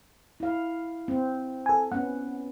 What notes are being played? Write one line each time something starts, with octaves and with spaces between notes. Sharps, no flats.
E4 F5
C4
A4 G#5
B3 C#4 F#5